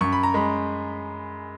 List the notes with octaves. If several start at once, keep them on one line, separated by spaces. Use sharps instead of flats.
F#2 C#6
B5
A#5
G#3 B5